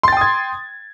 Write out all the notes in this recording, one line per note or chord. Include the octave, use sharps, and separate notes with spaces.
G5 C6 D#6 G#6 A6